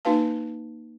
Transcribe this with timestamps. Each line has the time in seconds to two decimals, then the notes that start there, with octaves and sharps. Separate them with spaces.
0.05 A#3 D#4 F#4 B4 F5 A5